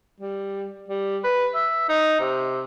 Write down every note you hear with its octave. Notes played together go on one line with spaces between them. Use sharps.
G3
G3
B4
E5
D#4
C3